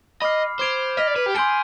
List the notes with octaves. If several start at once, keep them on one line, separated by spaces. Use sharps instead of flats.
D#5 B5 D6 F6 C7
C5 D6 G#6 D7 F7
D#5 F6 B6 F7
D5
B4
G4
G#4 C6 G6 D7 G7